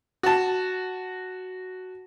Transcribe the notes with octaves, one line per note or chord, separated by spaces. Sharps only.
F#4 A5